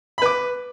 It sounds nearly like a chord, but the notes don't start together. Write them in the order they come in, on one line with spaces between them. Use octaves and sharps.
B5 B4 D6